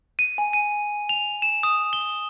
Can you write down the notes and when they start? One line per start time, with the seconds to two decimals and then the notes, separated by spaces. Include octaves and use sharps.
0.19 D#7
0.38 G#5
0.53 D#7
1.09 F7
1.42 E7
1.63 D#6
1.93 G7